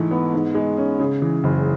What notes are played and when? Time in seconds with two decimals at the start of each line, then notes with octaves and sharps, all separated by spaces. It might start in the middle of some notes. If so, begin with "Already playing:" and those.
Already playing: G#2 E3 A3
0.11 B3
0.33 G#2
0.55 G#3
0.77 C#4
0.99 C#3
1.22 E3
1.44 F#1